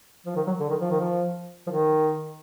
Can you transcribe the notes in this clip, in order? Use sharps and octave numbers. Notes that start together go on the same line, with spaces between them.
F3
D#3
F#3
D3
D#3
F3
D#3
F3
F3
D#3